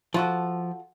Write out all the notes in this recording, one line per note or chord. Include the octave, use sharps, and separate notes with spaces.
F3 F4 F#4 A4